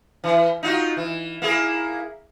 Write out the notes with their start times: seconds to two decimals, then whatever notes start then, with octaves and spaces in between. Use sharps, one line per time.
0.24 E3
0.63 D#4 F4 F#4
0.97 E3
1.42 A#3 E4 G#4